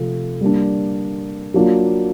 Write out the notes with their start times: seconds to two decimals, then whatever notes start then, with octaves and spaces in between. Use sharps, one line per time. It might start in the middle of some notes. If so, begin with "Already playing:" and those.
Already playing: C3 F3 A3
0.41 G3 A#3 D4
1.54 F#3 A#3 D4 F4